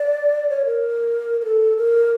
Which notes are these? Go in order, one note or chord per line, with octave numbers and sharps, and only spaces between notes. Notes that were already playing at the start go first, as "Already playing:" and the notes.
Already playing: D5
C#5
A#4
A#4
A4
A#4